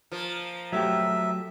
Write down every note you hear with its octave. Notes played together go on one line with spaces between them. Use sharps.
F3 A#3
F#3 A3 G4 E5